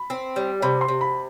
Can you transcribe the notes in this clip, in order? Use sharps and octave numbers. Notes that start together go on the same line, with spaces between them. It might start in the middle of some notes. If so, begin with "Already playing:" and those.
Already playing: B5
C4
G3
C3 B5
C6
C3
B5